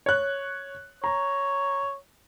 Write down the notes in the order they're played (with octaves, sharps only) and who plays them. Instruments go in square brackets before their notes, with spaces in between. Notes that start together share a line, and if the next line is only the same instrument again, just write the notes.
[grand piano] C#5 F#6
[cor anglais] C#5 [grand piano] A#5